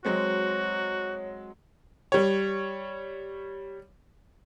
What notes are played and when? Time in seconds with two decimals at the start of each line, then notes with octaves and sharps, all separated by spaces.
0.05 F#3 G#3 C4 F#4 C#5
2.12 G3 C#5